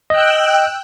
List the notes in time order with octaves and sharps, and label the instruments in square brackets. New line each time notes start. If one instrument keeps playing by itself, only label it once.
[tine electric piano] D#5 [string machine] G5 E6 F#6